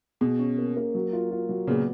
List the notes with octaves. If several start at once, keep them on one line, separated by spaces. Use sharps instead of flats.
B2 G#4
C#4
A#3
A#3
F#3
F4
F4
F#3
A#2 C#3 B3